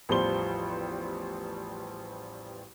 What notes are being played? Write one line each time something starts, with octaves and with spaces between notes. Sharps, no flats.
A1 E2 F3 G3 C5 G7